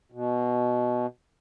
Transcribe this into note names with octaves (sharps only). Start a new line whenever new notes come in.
B2